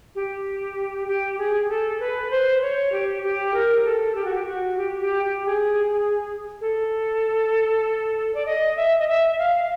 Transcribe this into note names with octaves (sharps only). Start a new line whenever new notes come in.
G4
G4
G#4
A4
B4
C5
C#5
G4
G4
A#4
A4
G4
F#4
G4
F#4
G4
G4
G4
G#4
A4
D5
D#5
E5
D#5
E5
F5